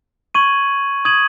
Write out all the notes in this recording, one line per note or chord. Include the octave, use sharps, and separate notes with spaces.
C#6 G#6 D#7 F#7
D#6 G#6 D#7 F#7